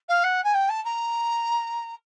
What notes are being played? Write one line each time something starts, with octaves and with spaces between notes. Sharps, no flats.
F5
F#5
G#5
G5
A5
A#5